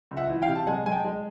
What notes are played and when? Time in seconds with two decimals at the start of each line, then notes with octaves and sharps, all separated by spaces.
0.11 C#2
0.17 E5 F#5
0.30 E3
0.42 F5 G5
0.48 C3
0.55 A5
0.67 G#3 F#5 G#5
0.86 G#3 G#5
0.92 G5 A5
1.04 G#3